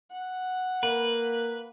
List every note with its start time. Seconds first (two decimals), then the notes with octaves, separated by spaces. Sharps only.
0.10 F#5
0.83 A#3 B4